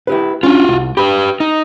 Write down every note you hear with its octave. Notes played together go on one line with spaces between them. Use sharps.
E4 G4 B4
C#4 D4 F4 F#4
C2
G4 B4 B5
D#4